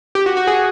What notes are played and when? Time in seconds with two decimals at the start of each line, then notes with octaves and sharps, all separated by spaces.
0.15 G4
0.26 F#4
0.37 F#4
0.47 F#4 G#4